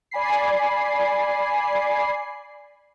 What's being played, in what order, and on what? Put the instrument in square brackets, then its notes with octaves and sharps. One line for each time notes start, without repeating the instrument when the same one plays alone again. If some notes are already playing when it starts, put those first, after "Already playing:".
[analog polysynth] D5 G#5 B5 C7